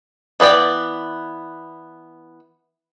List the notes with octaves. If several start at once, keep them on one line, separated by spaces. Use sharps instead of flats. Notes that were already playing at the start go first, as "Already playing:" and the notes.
E3 B3 D5 G5